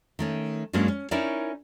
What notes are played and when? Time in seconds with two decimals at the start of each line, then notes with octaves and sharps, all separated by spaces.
0.19 D#3 A3 C#4
0.73 G2 F#3 G#3 A#3 C#4 D4
0.88 C#4
1.11 C#4 D#4 E4 A#4 C#5 D5